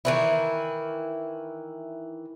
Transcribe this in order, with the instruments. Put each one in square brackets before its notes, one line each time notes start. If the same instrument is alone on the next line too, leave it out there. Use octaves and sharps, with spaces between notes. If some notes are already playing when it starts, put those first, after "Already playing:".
[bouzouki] D#3 E3 E4